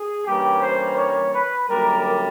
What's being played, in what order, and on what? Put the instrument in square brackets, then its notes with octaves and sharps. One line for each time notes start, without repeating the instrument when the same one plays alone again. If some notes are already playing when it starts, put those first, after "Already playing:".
Already playing: [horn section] G#4
G2 E3 G3 A#3 C#4 G4
C5
C#5
B4
F#2 D3 G3 A#3 A#4